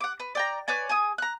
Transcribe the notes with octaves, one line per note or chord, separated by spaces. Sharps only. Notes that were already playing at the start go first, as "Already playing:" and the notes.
F#5 D6
B4
D5 G5 A#5
B4 C#5 D5 G#5
G#4 G#5 D#6
A#5 F#6